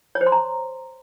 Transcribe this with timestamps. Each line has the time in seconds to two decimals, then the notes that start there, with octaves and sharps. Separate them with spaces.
0.15 C#5
0.21 C5
0.27 C6
0.32 A#5